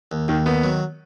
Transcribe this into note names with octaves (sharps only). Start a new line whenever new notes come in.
D#2
D#2 D#3
D#3 B3
F#3